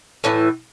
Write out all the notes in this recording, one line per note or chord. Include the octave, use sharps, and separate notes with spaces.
A2 E3 C#4